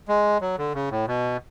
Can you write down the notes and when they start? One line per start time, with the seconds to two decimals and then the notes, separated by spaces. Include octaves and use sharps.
0.08 G#3
0.41 F#3
0.58 D3
0.74 C#3
0.91 A2
1.07 B2